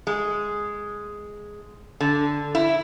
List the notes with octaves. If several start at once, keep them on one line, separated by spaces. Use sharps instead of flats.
G#3
D3
E4